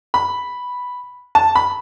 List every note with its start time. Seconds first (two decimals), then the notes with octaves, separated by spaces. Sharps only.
0.14 B5
1.35 A5
1.55 B5